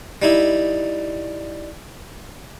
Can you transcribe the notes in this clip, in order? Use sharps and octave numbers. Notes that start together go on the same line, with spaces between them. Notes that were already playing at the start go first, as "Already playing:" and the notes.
G3 D#4 E4